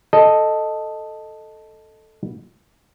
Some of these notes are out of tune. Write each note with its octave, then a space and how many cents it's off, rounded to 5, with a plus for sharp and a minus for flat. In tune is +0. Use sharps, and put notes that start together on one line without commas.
A4 +0 D#5 -5 G5 +0